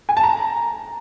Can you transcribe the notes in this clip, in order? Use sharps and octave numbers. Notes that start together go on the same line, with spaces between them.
G#5
A5
A#5